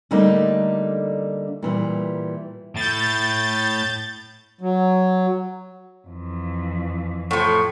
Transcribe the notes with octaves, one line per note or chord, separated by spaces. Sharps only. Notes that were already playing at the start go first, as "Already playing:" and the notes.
D3 G3 A3 A#3 D4 D#4
A#2 E3 G3
A2 G6 A6
F#3
F2 E3
A2 F3 C#6